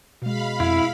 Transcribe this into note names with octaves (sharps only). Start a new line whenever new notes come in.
B2 G#3 F5 B5
F2 E4